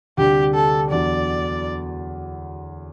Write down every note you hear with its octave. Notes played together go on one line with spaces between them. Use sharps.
D2 C3 G3 D4 G4
A4
E2 D3 F#3 D5